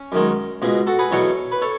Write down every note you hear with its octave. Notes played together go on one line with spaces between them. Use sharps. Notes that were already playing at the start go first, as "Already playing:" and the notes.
Already playing: C#4
F#2 D#3 G#3
C#2 B2 G#3
F#4 A4
G#4 B4
E2 B2 F#3 A4 C#5
B4
A4 C#5